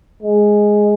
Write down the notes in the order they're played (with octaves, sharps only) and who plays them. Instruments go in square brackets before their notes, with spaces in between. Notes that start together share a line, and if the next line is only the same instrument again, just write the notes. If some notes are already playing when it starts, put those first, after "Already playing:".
[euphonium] G#3